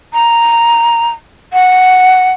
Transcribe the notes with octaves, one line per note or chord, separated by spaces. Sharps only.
A#5
F#5